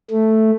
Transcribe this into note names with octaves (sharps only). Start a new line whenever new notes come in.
A3